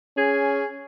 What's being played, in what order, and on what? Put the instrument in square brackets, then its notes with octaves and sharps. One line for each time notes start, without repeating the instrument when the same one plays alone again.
[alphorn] C#4 [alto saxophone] G#4